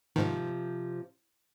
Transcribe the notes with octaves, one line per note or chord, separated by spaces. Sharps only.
G#2 C3 D#3 F3